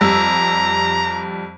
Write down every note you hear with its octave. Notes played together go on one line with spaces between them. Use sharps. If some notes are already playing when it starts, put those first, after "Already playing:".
F2 G3 A#5 E6